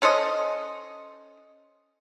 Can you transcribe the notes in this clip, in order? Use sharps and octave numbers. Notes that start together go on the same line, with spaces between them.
C#4 A4 C5 D#5